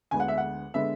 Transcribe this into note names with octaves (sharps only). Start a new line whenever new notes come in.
D2 D3 G#3 B3 G#5
F#5
E5
F#5
D3 G#3 B3 E5